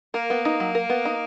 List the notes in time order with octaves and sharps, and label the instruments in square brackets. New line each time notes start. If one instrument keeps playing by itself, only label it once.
[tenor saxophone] A#3 [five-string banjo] A#4
[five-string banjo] B3
D#4
F#3
A#4
B3
D#4